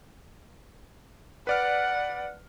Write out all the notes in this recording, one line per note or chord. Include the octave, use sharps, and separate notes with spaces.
B4 D5 F#5 F6